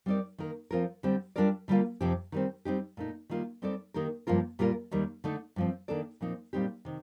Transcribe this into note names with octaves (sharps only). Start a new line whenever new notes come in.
G3 C4 D#4 A#4 D5
D#3 A#3 D#4 A#4
F3 C4 F4 A#4
D3 G3 C4
G3 D4 F4 A#4 D5
D3 G3 A#3 F4
F2 C3 F3 C4 G4
D#3 G3 C4
G3 C4 D#4 G4
A#2 A3 D#4
D#3 G3 A#3 F4
G3 C4 D#4 A4 D5
D#3 A#3 D#4 G4 A#4
G2 F3 A#3 F4 A#4
A#2 G3 A#3 F4 A#4
D#2 D#3 G3 A#3
D3 A3 D#4
G2 F3 C4
D#3 A#3 D4 A4 D5
A#2 F3 C4 D#4
A#2 G3 C4 D#4 G4
C3 D#3